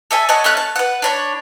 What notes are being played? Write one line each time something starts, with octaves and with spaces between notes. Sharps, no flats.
A4 E5 G#5
C#5 D#5 F#5 A5
A3 C#4 C#5 F#6
A5
B4 F#5
D4 C#5 B5